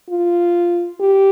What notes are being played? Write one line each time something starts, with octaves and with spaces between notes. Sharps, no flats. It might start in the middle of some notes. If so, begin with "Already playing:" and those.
F4
G4